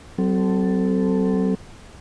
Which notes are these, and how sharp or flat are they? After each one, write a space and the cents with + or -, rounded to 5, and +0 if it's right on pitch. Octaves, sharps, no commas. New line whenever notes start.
F#3 +40 C4 -15 A4 +0